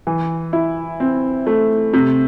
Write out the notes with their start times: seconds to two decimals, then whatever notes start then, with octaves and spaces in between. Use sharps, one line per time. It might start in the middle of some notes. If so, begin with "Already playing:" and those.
0.07 E3
0.53 E4
1.00 C4
1.47 A3
1.93 C3